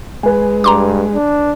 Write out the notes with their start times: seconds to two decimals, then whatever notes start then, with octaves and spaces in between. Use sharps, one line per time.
0.23 G#3 B4 G#5
0.64 G2 A#5 C6 D6
1.15 D4